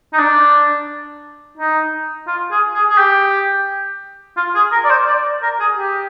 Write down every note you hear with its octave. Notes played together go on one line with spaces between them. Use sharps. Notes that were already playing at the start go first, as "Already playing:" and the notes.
D#4
D4
D#4
F4
G#4
G#4
G#4
G4
F4
G#4
A#4
D5
C5
D5
A#4
G#4
G4